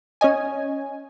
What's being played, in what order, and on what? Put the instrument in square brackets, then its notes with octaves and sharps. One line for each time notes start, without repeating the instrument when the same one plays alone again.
[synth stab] C#4 C#5 D#5 G#5